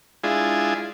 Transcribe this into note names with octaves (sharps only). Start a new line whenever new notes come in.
G#3 D4 E4 F4 G#4